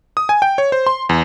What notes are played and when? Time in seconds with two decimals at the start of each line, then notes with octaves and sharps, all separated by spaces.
0.17 D#6
0.29 G#5
0.42 G5
0.58 C#5
0.72 C5
0.87 C6
1.09 E2